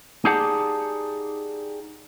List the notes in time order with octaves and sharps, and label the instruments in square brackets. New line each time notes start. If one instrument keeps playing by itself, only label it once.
[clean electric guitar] D#4 G4 G#4 D5 F#5 A5